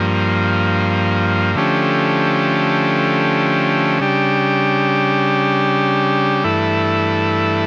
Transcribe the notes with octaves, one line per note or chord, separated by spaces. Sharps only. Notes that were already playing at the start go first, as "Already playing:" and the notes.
Already playing: G2 F3 A#3
D3 F3 A3 C#4 G4
C#3 G3 D4 G4
G2 E3 A3 E4 A4